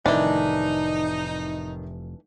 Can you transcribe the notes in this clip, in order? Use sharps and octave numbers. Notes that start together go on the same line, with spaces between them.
F1 A2 D#3 E3 D4 D#4